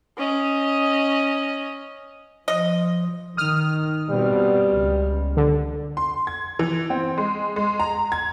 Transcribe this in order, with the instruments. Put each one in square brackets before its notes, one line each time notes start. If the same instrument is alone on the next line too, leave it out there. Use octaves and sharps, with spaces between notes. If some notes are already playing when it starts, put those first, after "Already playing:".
[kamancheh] C#4 D#5
[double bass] F3 [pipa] D#5
[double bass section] D#3 [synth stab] D#6 F6
[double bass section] B2 C4 [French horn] G3
[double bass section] C#2
[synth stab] D3
[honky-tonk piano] C6
G#6
E3
C4
G#3
G#3
A#5
G#6